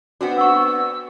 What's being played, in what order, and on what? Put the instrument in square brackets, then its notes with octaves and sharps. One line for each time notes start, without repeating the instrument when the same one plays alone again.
[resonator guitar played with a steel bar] B3 C4 D4 [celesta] F#4
[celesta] F#5 C#6 [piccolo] E6